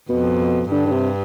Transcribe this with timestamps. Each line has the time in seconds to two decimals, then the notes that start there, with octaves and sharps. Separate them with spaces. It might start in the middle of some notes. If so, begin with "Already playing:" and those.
0.09 F2 B2
0.71 G2 D3
0.87 D3
0.92 C3